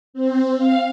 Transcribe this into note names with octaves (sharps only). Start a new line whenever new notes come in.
C4
F5